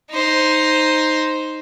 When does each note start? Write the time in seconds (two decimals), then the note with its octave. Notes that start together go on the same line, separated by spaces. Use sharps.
0.11 D#4 C5